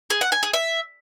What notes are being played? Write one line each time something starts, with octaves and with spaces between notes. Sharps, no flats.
G#4
F#5
G#5
G#4
E5